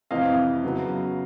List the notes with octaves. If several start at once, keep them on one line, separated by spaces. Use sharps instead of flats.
F2 C3 E3 D#5 F5
C#3 F#3 B3